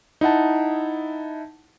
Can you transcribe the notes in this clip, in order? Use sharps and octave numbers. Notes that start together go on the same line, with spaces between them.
D#4 E4 F#5 A5